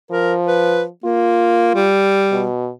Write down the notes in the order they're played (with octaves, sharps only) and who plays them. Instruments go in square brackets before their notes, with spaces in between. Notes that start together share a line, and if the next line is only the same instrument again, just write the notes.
[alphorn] F3 [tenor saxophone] A#4
[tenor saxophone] B4
[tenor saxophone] A#3 [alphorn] F4
[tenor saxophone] G3
[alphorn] B2